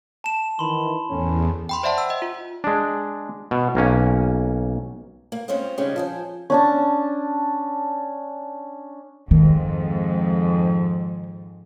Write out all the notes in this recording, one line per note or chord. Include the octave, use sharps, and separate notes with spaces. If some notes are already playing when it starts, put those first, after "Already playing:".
A5 E7
D#3 E3 B5 C6
E2 A2 C#4
G5 B5 C6
C5 D5 E5 F#5 A5 C6
E6
D#5
F4
G#3 D4
B2
B1 A#3 C#4
A#3
G#3 C4 C#4 F4 C5 F5
C#3 G3 G#3 C4 C#4 D#4
F3 C5 G#5
C#4 D4 A5
F2 G#2 D#3